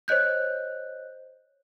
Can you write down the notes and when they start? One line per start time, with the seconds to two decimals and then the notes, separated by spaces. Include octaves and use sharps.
0.08 C5 C#5 D#5 F#6 G6